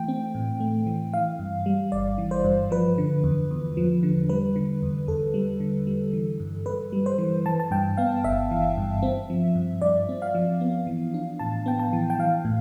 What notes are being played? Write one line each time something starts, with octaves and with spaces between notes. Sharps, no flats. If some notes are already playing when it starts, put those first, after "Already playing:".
Already playing: E3 A3 G5
C4
A2
A3
E3
E3 F5
G2
G3
G1 D5
E3
C5
G2
F3 B4
D3
E2
E2
F3
D3
G3 B4
D3
E2
E2 A4
G3
D3
G3
E3
G2
G2 B4
G3
C5
E3
E3 A5
A5
G2 G5
B3 F5
G1 E5
E3
G2
C4
F3
G2
G2 D5
C4
F5
F3
B3
E3
D4
A2 A5
B3 G5
A5
E3
G5
E3 F5
A2